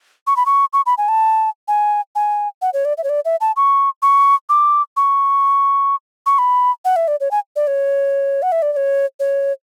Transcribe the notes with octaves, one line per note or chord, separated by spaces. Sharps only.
C#6
B5
C#6
C#6
B5
G#5
A5
G#5
G#5
F#5
C#5
D5
E5
C#5
D5
E5
A5
C#6
C#6
D6
C#6
C#6
B5
F#5
E5
D5
C#5
G#5
D5
C#5
F#5
E5
D5
D5
C#5
C#5